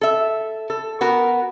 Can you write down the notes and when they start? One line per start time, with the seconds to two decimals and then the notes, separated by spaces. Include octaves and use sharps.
0.01 A4 E5
0.70 A4
1.01 B3 F#4 A#4